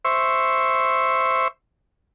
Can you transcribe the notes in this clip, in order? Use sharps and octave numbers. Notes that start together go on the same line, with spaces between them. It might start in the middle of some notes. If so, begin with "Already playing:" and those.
C5 E5 C#6